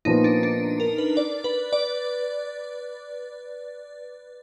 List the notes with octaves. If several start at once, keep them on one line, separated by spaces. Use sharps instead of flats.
A#2 F3 B3 D#4
D4
D4
A#4
B4
D5
B4
D5